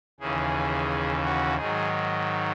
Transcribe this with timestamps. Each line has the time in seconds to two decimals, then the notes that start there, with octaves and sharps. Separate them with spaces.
0.20 D#2 C#3 E3 G#4
1.24 F#4
1.57 G#2 D#3 F#3 G#4